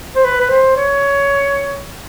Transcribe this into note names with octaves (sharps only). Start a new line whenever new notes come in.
C5
B4
B4
C5
C#5